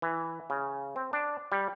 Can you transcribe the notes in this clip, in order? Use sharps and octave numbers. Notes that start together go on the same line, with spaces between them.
E3
C#3
C4
D4
G3